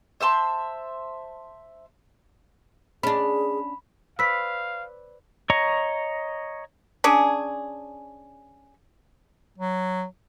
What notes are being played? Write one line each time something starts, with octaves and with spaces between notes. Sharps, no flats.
C5 E5 A5 C6
C#4 D4 G#4 B5
B4 C5 D5 F5 E6 B6
C#5 D#5 A#5 C#6
C#4 D4 G#4
F#3